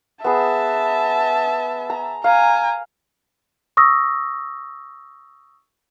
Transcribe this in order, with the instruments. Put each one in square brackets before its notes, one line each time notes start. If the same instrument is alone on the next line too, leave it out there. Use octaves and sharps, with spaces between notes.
[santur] B3 G#4 [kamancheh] E5 A5
[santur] A#5
[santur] F5 [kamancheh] G#5 A#5
[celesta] C#6 D#6 E6 A#6